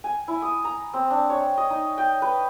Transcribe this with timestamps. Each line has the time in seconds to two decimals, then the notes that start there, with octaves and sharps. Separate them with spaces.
0.04 G#5
0.28 E4
0.42 D#6
0.65 A#5
0.94 C4
1.11 D4
1.30 C#5
1.58 D#5
1.70 D#4
1.98 G5
2.22 B4